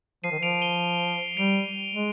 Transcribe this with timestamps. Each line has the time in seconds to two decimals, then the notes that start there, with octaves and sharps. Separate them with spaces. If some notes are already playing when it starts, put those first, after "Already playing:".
0.24 F3 C7 D#7
0.31 D#3
0.39 F3 D7 F7
0.61 D#7 G7
1.37 G3 D7 F7
1.95 G#3